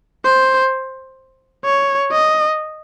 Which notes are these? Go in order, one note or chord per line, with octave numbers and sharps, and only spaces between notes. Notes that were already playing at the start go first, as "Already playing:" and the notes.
C5
C#5
D#5